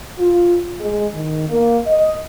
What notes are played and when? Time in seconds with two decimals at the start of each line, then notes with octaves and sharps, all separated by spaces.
0.18 F4
0.79 G#3
1.15 D#3
1.49 A#3
1.87 D#5